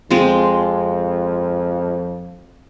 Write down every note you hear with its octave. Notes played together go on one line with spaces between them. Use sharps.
F2 G#3 C4 F4